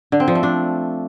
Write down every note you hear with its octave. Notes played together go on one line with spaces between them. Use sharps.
D3
C4
F3
A3
D4